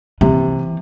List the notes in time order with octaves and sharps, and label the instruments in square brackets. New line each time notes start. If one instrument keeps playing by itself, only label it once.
[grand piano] C3 [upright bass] E3